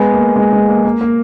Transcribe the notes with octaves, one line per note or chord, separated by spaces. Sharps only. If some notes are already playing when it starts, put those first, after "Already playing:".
Already playing: G#3 B3
A#3
G#3
G#3
A#3
A#3
A#3